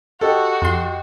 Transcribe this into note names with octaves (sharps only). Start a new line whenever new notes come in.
F#4 G4 A4 D#5 G5
F2 C6